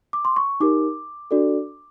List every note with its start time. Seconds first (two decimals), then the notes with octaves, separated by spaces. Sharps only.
0.13 D6
0.25 C6
0.36 C#6
0.60 D#4 G4 A#4 D6
1.31 D4 F#4 A4 D5